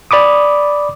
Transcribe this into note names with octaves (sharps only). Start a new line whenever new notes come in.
D5 B5 D6 D#6